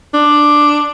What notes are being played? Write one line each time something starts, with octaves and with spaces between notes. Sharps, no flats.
D4